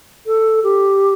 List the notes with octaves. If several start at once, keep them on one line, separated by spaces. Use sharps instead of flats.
A4
G4